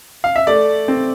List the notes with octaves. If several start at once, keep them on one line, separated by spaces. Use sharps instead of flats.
F5
E5
A3 D5
C4